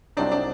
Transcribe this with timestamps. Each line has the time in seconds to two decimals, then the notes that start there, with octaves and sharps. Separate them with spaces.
0.17 C2 C3 F#3 C4 D4 D#4
0.32 D4